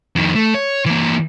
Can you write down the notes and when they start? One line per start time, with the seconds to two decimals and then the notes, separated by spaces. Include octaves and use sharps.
0.16 F2 D#3
0.35 A3
0.55 C#5
0.86 E3 A#3